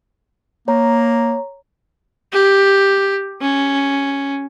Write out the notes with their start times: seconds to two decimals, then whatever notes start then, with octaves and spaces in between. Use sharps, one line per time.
0.68 A#3 C#5 A#5
2.32 G4
3.41 C#4